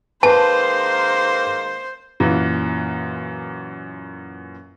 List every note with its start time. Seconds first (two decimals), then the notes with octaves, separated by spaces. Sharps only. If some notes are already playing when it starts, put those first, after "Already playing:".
0.23 D#3 G#3 A#3 B4 C5 A5
2.20 F#2 A#2 E3